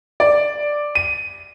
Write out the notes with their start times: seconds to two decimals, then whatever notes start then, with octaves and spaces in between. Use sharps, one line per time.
0.20 D5
0.95 D#7